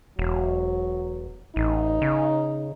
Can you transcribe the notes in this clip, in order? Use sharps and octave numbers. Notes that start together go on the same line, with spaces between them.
E1 F#3
A1 D#4
C#3